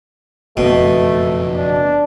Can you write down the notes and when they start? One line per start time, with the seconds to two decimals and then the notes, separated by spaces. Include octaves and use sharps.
0.57 F#1 F2 B2 A3
1.55 D4